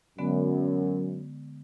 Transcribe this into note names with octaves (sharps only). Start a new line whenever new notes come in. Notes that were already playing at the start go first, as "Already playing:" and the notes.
F#2 D3 G#3 B3